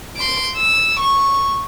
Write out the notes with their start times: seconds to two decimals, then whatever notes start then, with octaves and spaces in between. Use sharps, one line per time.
0.17 C6 D7
0.57 E6
1.00 C#6